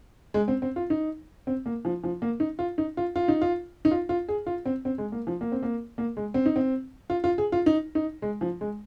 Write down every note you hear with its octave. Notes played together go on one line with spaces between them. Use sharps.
G#3
C4
C4
F4
D#4
C4
A#3
F3
F3
A#3
D#4
F4
D#4
F4
F4
D#4
F4
D#4
F4
F4
G#4
F4
C4
C4
G#3
A#3
F3
A#3
C4
A#3
A#3
G#3
C4
D#4
C4
F4
F4
G#4
F4
D#4
D#4
G#3
F3
G#3